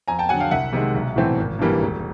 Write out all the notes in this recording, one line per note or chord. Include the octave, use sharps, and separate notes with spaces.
F2 G#5 A#5
G5 A5
D3 F#3 F#5 G#5
F5 G5
C2 E5 F#5
C3 D#3 G#3
B1
A2 E3 A3 C4
G#1
G2 E3 G3 A#3
E1